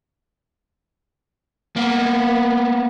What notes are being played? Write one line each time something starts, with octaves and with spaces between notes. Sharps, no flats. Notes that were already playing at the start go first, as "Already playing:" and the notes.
A#3 B3